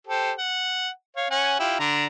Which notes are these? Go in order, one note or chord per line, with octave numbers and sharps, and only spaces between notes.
G4 A4 C5
F#5
C#5 F5
C#4 F#5 G#5
E4 F4 G4
D3 D4 A#5